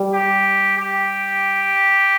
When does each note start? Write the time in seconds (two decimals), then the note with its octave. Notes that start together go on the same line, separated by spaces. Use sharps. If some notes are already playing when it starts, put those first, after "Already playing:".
Already playing: G3
0.14 G4
0.78 G4